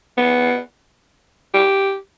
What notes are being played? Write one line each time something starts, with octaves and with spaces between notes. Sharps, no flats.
B3
G4